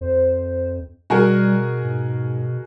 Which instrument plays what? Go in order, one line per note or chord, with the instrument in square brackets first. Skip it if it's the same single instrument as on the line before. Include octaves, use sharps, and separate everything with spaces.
[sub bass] F2 [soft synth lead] C5
[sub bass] B2 [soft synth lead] G3 [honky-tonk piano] F#4 G#4 A#4
[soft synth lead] G#2